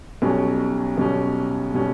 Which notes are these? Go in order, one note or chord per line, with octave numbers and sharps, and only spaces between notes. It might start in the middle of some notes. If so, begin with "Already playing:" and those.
B1 B2 G3 C#4
B1 B2 G3 C#4
B2 G3 C#4